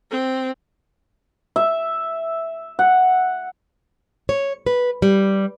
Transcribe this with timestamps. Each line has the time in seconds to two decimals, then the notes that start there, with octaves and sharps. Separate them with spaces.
0.11 C4
1.56 E5
2.79 F#5
4.29 C#5
4.66 B4
5.02 G3